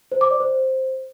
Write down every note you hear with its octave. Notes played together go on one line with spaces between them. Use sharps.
C5
D6
D5
C5